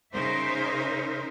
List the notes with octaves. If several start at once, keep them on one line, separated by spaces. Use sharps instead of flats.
C#3 D#4 A#4 C5 E5